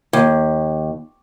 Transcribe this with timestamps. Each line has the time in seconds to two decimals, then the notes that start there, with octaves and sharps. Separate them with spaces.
0.13 D#2